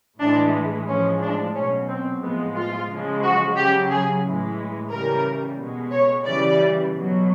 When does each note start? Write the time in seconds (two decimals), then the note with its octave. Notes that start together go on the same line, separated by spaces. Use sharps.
0.21 A2 E3 G#3 D4
0.88 A2 F3 G#3 C#4
1.22 D4
1.55 B2 F#3 C#4
1.89 C4
2.22 A2 F3 G#3 B3
2.56 F4
2.90 C#3 F3 G#3
3.23 F#4
3.57 C#3 F#3 G4
3.90 G#4
4.24 A2 E3 G#3
4.90 C#3 E3 G3 A#4
5.58 B2 G#3
5.92 C#5
6.25 C#3 E3 G3 D5
6.92 B2 F#3